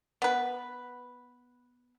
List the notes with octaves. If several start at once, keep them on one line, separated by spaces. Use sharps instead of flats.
B3 B4